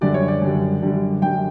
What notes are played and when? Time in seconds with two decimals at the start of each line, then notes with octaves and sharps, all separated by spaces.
0.01 F#2 D3 G3 D5
0.14 C#5
0.28 D5
0.42 F#2 D3 G3
0.82 F#2 D3 G3
1.22 F#2 D3 G3 G5